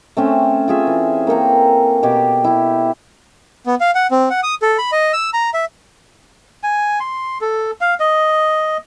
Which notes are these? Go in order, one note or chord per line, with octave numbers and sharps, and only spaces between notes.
A3 C4 C#4
F4 G#4 E5
E3
A#3 A4 G5 A#5
B2 G4 C#5 D6
E4 G4
B3
F5
F#5
C4
F#5
D#6
A4
B5
D#5
E6
A#5
E5
G#5
C6
A4
F5
D#5